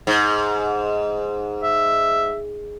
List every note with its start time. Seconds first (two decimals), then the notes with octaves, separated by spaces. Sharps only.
0.07 G#2
1.63 E5